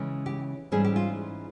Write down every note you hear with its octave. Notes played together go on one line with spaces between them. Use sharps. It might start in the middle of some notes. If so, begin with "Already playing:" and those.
Already playing: C#3 E3 G#3 C#4
G4
G#2 E3 G3 C#4 G#4
G4
F4